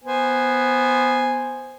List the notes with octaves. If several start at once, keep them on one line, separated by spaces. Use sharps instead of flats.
B3 C5 G#5